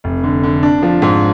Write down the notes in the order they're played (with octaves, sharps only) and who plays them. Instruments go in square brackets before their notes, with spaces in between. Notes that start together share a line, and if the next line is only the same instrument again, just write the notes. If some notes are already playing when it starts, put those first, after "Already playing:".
[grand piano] F1
D3
D3
D4
F3
G#2